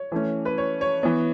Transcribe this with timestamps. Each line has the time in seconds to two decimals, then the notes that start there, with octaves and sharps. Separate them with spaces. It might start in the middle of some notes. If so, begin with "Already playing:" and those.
Already playing: C#5
0.12 E3 A3 C#4
0.45 B4
0.58 C#5
0.81 C#5
1.03 E3 B3